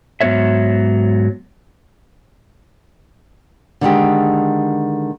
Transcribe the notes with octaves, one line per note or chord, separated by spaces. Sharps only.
G#2 F#3 B3 B4 C#5 E5
D3 D#3 G#3 G4